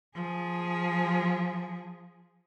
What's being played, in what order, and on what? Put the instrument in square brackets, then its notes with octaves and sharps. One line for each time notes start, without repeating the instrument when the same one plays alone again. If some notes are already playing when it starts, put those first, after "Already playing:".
[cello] F3 G#4